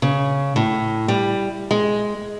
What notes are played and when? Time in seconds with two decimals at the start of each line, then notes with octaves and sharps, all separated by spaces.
0.02 C#3
0.56 A2
1.08 G3
1.71 G#3